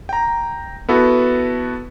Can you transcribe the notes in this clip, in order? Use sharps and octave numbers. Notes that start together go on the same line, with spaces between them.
G5 A#5
B3 E4 F#4 A4 B4